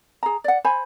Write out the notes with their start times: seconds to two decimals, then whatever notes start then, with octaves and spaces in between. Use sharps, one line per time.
0.23 G#4 A#5
0.44 D5 F#5
0.65 C5 G#5 B5